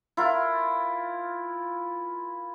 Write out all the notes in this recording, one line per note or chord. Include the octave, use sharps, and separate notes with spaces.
E4 F4 A#4